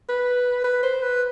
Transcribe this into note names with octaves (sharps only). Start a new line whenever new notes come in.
B4
B4
C5
B4